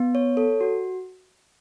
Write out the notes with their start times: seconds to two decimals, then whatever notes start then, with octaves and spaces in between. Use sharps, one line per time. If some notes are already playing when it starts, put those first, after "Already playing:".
Already playing: B3
0.15 C#5
0.37 A4
0.61 F#4